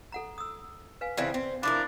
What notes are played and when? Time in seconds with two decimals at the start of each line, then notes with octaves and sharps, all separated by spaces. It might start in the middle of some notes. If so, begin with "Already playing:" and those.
0.12 A4 F#5 A#5
0.38 D#6 E6
1.01 B4 F5 G#5
1.17 C#3 E3 C4 D5 F5
1.34 C4
1.63 F3 D4 E4 A#4 B5 D6